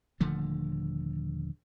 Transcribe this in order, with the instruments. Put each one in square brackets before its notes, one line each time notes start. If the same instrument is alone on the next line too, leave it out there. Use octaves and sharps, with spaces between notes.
[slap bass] D#1 D3 F3 A3